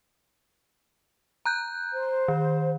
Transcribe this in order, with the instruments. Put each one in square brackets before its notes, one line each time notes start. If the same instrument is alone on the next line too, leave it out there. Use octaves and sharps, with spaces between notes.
[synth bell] A#5 F#6 G6
[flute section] C5
[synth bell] D#3